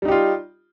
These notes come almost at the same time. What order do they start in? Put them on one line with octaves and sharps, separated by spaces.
G3 D#4 G4 F4